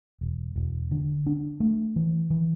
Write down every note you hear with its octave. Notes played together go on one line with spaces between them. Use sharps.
E1
E1
D3
D4
A3
E3
E3